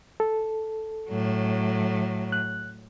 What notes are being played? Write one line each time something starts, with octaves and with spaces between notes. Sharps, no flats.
A4
A2 F#3
F#6